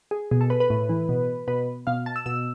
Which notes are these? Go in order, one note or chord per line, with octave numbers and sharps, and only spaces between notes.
G#4
B2 G#4
A4
B4
B4
A2
E3
B2
B2 B4
B2 F5
A5
E6
B2 E6